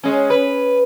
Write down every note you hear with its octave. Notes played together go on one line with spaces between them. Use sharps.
G#3 C#4
B4